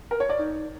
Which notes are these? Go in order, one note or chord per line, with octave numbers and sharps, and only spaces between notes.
A#4
C#5
D5
D#4